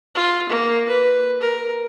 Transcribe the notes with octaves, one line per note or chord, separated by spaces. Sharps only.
F4
A#3
B4
A#4